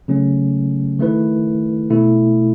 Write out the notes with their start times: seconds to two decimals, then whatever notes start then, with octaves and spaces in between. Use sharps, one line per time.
0.08 C#3 F#3 A3 C#4
0.99 D#3 A3 E4 B4
1.90 B2 A3 E4